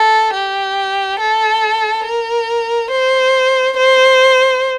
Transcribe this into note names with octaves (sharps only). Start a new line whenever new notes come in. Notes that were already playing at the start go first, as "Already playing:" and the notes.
Already playing: A4
G4
A4
A#4
C5
C5